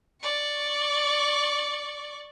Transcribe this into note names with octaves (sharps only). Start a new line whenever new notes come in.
D5 C#6